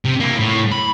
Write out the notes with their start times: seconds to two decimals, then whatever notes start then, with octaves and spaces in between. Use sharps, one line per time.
0.05 C3
0.20 A#3 E4
0.39 A2
0.72 B5